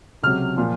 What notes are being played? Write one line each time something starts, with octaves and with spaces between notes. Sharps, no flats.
C#2 C3 F#3 F6
A#2 F3